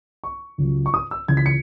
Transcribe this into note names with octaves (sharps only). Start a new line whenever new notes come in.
C#6
C#2 C#3 F#3
C#6
D#6
E6
C#2 C#3 E3 G#6
B6
C#7